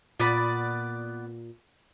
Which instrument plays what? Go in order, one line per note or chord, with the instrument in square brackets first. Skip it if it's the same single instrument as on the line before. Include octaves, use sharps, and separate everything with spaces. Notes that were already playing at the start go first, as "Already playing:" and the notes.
[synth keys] A#2 [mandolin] B3 D5 B5